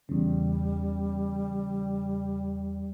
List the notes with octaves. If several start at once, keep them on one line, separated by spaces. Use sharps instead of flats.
E2 C#3 G3